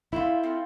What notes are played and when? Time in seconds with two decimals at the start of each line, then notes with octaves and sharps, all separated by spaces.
0.12 A3 C4 E4 F4
0.43 A3 C4 F4